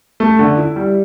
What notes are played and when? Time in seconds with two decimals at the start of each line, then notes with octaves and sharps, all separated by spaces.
0.20 A3
0.39 D3
0.57 E4
0.76 G3